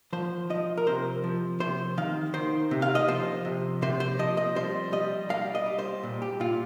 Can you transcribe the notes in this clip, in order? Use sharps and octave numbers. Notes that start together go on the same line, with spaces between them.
F3 C5
F3 D#5
A#4
C3 C5
F3
C3 C5
D#3 F5
D#3 C5
C3
F5
D#5
F3 C5
C3
C3 C5
C5
F3 D#5
D#5
G3 C5
G3 D#5
G3 F5
D#5
G3
C5
A#2
G4
A#2 F4